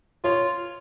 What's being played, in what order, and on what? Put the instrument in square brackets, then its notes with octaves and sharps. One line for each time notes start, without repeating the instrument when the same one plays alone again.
[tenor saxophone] F4 [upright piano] C#5